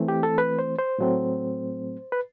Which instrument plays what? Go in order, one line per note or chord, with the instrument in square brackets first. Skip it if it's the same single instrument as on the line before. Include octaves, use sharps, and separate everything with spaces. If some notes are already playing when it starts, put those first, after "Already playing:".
Already playing: [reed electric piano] E3 A3 C4
G4
A4
B4
C5
C5
A2 F#3 A3 C4
B4